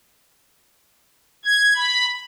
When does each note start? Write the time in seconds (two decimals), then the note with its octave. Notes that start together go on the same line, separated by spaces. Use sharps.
1.45 G#6
1.76 B5